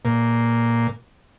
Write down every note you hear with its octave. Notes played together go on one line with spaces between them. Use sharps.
A#2